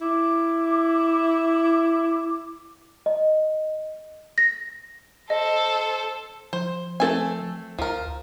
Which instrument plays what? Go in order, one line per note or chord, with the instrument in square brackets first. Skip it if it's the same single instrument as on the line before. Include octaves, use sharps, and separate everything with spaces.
[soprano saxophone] E4 [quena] D6
[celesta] D#5
[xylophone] A#6
[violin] A4 C5 [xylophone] D#5
[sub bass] F3 [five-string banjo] C5
[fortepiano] A3 C4 [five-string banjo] A4 G#5
[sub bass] D2 [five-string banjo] F3 A#4